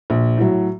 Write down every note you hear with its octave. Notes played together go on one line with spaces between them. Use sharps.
A#1
A2 F#3